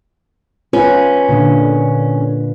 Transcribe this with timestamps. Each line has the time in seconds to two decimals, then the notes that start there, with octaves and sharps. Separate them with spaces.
0.73 C#4 F4 B4
1.29 A#2 D3